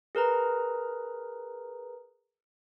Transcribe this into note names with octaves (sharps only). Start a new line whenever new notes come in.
G#4 A#4 B4 A#5